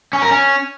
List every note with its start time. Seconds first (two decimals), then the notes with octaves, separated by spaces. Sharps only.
0.13 C#4
0.22 A#4
0.31 C#4